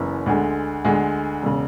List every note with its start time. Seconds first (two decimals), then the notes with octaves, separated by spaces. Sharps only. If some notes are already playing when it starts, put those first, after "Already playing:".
Already playing: F#1 F#2 E3 B3
0.26 D2 D3 G#3
0.85 D2 D3 G#3
1.42 E1 C#3